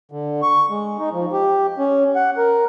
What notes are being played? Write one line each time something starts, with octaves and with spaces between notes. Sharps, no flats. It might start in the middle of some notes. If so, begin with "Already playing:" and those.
D3
C#6
G#3
D#4
F3
G4
C#4
F#5
A#4